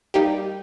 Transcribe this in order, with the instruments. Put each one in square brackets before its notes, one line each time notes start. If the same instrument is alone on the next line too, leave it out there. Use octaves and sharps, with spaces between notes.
[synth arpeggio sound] G3 A#3 D#4 G4